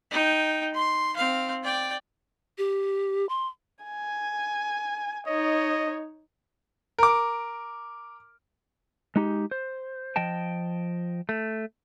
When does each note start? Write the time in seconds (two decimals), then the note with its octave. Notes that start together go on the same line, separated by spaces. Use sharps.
0.11 D#4 G5
0.74 C6
1.16 C4 F5
1.63 D5 G5
2.58 G4
3.29 C6
3.84 G#5
5.26 D#4 C#5 D#5
6.98 A#4 D6
9.16 G#3 D#4 G4
9.51 C5
10.16 F3 D#5 G5 A5
11.29 A3